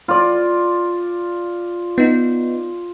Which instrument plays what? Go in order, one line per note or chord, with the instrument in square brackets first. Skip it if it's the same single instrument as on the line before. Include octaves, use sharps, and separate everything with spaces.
[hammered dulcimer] F4 D5
[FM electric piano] B3 D#4